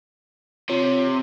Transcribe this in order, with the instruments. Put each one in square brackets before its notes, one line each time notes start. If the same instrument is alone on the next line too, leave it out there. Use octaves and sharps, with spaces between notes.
[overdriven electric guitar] C3 [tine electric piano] F4 C#5